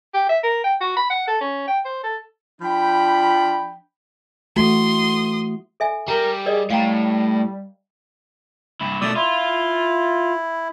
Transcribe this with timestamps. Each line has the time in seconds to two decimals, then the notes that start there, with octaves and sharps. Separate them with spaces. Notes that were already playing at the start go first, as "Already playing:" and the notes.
0.14 G4
0.29 E5
0.44 A#4
0.64 G5
0.81 F#4
0.97 B5
1.10 F#5
1.27 A4
1.41 C#4
1.68 G5
1.85 C5
2.04 A4
2.62 F3 D4 G5 B5
4.56 E3 A3 F#4 C6 D#6
5.80 A4 E5 G#5
6.08 G3 A#4 A#5
6.46 G#4 A#4 D5 D#5
6.70 A2 G3 F5 G5 A#5
8.81 G2 E4
9.01 B2 A3 D5 D#6 E6
9.15 E4 F4